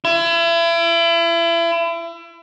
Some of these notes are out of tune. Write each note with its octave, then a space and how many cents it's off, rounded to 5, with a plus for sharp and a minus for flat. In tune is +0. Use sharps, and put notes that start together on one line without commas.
E4 +35